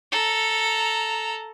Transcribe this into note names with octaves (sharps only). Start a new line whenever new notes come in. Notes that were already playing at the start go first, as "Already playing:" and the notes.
A4 A#5